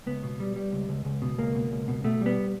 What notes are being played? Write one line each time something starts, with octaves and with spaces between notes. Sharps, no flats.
C#2 B3
B2
G3
G3
C#2
C#2
C#2
B2
C#2 A#3
B2
C#2
B2
B2 A3
G3
B3